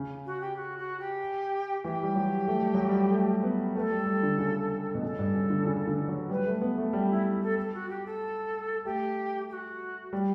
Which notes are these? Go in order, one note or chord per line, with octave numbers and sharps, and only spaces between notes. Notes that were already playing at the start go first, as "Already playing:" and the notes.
Already playing: C#3
F#4
G4
F#4
F#4
G4
E3 G4
G3
F#3
A3
G3
F#3
G3
A3
B3
A3 B4
A4
G3
G3
D3
C#3
B2
C#3 A4
G2
C#3
D3
C#3
D3
F#3
G3 B4
A3
B3
A3
G3 G4
E4
A4
A4
F#4
G4
A4
A3 G4
G4
F#4
G3